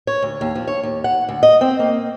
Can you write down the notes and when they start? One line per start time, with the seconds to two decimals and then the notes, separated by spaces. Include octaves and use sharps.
0.07 C#5
0.22 D2
0.41 D#2
0.55 F3
0.67 C#5
0.83 D#2
1.04 F#5
1.29 D2
1.43 D#5
1.61 C4
1.79 A#3